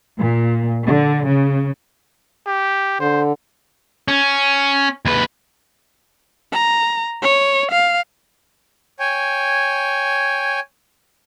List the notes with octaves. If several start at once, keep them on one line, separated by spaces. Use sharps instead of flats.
A#2
D3
C#3
G4
D3 C5
C#4
D#2 B4
A#5
C#5
F5
C#5 G5 G#5